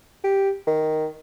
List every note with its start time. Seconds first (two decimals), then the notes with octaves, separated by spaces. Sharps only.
0.24 G4
0.67 D#3